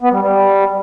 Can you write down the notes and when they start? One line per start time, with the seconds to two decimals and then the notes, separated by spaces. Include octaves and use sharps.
0.01 B3
0.11 G3
0.22 G3